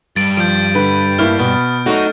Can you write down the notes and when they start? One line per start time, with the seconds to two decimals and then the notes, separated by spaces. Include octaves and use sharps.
0.16 G2 G3 A6 D7
0.37 F3 G6 D7
0.75 D3 B4
1.19 A2 A#3 E4 F6
1.39 B2 B3
1.86 F#3 A3 D#4 F#4